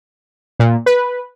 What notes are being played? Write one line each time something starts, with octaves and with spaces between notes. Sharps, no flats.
A#2
B4